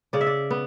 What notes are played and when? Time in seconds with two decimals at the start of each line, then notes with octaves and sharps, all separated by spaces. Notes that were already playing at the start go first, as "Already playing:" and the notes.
0.13 C#3 D5
0.21 E5
0.27 D5
0.51 B3